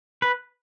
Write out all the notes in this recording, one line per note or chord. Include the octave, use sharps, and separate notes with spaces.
B4